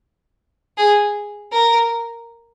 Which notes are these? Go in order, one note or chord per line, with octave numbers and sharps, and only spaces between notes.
G#4
A#4